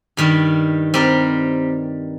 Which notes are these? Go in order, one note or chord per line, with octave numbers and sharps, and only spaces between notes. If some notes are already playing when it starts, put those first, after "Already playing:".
G2 D#3 G3
G3 C4 G4 A#4